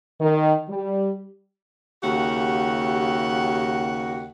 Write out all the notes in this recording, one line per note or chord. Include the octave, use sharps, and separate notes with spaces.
D#3
G3
D#2 C#3 F#4 G4 F#5